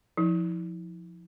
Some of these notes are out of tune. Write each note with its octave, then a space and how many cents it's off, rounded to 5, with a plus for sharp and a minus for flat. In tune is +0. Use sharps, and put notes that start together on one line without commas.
F3 +0 E4 -40